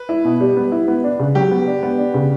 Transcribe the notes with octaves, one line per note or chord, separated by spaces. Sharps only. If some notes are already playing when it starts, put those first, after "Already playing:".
Already playing: B4
E4
B2
G3
B3
E4
B3
D4
C#3
F#3 G4
B3
D4
B3
D4
C#3